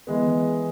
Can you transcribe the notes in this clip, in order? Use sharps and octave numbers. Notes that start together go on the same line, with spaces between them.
E3 G#3 B3